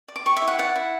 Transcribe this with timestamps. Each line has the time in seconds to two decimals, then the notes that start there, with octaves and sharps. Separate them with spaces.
0.08 D5
0.16 D6
0.25 G4 C#6
0.37 E5
0.42 E4
0.48 F#5
0.59 D5 F#5
0.76 E4